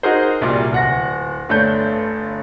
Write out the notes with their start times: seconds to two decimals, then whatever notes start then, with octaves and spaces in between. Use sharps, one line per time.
0.03 D#4 F#4 G#4 A#4 C5
0.41 C2 A#2 G3
0.72 D1 F#5 A#6
1.49 G1 A3 D4 B4 C#5 G6